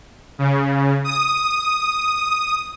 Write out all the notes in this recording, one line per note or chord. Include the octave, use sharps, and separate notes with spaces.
C#3
D#6